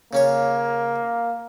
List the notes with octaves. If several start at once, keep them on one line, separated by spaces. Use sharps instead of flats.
C#3 A#3 C#4 C#5